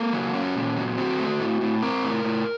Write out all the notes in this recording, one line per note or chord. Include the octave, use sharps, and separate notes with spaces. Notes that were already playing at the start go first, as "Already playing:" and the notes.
Already playing: A#3 A4
F#3
C#4
A#2
F#3
C4 F#4
A3
A2
A2
C4 A#4
A2
A2